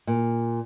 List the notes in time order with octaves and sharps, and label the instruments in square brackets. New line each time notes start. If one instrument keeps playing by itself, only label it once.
[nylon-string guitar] A#2